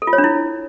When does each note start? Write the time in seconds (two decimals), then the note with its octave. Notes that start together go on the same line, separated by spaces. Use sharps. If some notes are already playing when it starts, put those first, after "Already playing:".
0.02 A4
0.07 F4
0.13 C#5
0.18 D4
0.24 E4